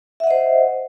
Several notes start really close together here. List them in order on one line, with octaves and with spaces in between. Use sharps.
E5 F#5 D#5 C5